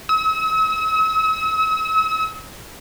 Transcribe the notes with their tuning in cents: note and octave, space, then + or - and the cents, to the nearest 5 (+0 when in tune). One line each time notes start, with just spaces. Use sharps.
E6 -45